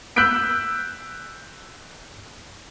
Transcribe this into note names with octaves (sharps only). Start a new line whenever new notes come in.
E6 F#6 G6 B6 D7